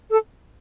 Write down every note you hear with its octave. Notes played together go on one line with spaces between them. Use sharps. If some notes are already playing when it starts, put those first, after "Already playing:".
A4